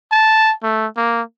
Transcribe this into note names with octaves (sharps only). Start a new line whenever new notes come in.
A5
A3
A#3